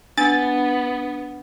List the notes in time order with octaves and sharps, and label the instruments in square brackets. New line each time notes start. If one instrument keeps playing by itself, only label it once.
[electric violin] B3 [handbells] D4 [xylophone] G#5 [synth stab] A6